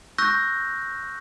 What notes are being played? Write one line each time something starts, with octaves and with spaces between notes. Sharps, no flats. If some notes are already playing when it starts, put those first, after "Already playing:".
C#6 E6 F#6 G6 A#6